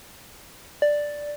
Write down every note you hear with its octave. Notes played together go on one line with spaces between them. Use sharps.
D5